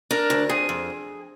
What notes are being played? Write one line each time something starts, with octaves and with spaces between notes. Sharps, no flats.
D4 A#4
D2
F2 G#4
F2